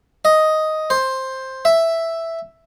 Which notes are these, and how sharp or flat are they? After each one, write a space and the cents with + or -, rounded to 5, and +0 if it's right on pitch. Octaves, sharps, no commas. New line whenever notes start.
D#5 +5
C5 +10
E5 +0